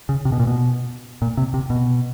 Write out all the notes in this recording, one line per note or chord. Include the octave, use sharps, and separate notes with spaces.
C#3
C3
B2
A#2
B2
A#2
C3
C3
B2